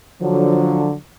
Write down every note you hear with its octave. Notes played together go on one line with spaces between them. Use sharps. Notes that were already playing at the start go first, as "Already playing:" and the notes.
D3 F3 F#3